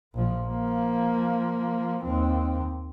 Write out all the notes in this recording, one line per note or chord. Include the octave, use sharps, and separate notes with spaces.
A#1 F3
F3 A#3
D#2 C4